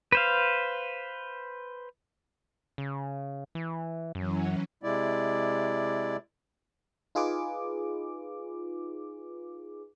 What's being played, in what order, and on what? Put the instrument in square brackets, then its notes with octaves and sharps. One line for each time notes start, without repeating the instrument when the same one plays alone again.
[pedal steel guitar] B4 C5 F5
[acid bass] C#3
E3
[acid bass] F#2 [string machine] E3 F#3 C#4
[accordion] C3 G#3 E4 D5
[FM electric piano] D#4 F4 G#4 B4 D6